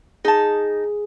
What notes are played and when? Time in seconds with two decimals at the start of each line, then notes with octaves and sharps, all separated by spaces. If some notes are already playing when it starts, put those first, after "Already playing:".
0.25 D#4 G#4 A5